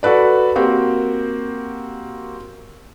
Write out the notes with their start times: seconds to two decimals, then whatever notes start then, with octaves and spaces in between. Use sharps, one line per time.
0.03 F#4 A4 B4 D5
0.56 A#3 C4 F#4 G4